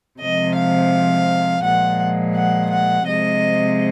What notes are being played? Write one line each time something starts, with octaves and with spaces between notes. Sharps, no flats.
C3 F3 G#3 D#5
F5
A#2 F3 G#3 F#5
F#5
F#5
C3 F3 G#3 D#5